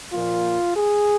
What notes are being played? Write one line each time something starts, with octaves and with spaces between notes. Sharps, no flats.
A#2 F3 A#3 F4
G#4